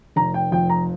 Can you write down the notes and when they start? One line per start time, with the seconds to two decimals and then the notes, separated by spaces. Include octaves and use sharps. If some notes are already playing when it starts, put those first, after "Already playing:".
0.16 F1 A#5
0.34 G5
0.52 F2 G5
0.70 A#5